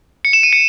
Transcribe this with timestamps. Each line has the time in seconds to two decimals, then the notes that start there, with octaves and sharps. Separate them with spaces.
0.25 C#7
0.33 E7
0.43 D#7
0.53 C#7